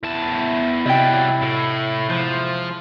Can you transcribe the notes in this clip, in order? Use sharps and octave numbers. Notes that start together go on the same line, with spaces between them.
E2 E4 A5
C3 F#3 G3 D#5 G5
A2
E2 F3 G#3 C5